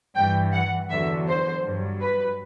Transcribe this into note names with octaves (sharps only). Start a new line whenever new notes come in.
G2 E3 G5
F#5
E2 D3 F#3 E5
C5
G2 F#3
B4